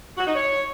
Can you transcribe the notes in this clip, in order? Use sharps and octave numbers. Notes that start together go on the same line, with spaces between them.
F#4
D#4
C#5